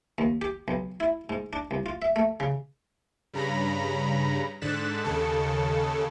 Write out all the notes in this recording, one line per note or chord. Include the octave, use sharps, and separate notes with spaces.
D#2
G4
B1
E4
G#2
D4
C2
F4
E5
A3
C#3
G2 C#3 A#5 B5 A#6
G#2 D3 F#6 A6 B6 E7
D#2 C#3 A4